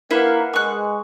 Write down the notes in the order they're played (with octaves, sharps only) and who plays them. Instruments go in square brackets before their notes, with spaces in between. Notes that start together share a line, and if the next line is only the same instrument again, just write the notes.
[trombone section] A#3 [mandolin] E4 [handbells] A#4 B4 F#5
[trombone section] G#3 [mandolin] C#6 F#6